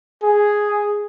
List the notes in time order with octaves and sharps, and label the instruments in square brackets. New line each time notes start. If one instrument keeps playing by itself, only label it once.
[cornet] G#4